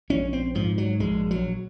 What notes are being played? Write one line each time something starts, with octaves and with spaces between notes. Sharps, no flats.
A#1 C#4
C4
G#2 F3
F#3
A#1 G#3
F#3